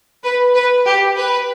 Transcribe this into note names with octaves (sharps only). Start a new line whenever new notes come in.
B4
B4
G4
B4